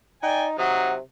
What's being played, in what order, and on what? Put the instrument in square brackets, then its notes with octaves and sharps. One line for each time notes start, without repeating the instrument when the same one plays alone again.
[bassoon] D#4 [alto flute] D5 [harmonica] G5 G#5
[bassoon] C3 [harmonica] F#3 D#4 [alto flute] F#5